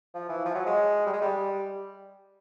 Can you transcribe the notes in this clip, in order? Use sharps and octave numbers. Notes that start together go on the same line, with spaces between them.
F3
E3
F3
F#3
G#3
G3
G#3
G3